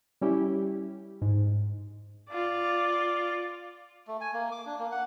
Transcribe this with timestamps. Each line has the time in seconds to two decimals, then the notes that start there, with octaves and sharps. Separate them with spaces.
0.21 G3 C#4 E4 G4
1.22 G#2
2.30 F4 D5
4.08 A3
4.21 G#5
4.33 A#3
4.52 D6
4.66 D4
4.79 A#3
4.92 F#5